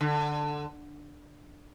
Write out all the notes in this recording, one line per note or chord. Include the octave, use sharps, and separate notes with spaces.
D3